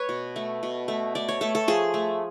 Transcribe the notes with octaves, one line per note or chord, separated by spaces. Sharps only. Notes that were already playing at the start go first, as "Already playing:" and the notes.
Already playing: B4 C#5
B2
A3
B2
A3
A3 D5
C#5
A3 A4
A4
F3 G#4
A3